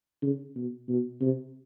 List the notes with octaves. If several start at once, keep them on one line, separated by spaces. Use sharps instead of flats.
C#3
B2
B2
C3